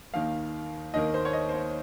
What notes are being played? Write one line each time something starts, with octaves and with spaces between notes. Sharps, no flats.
D#2 D#3 A#3 F5
D#2 D#3 A#3 D#5
C5
C#5
D#5
C5
C#5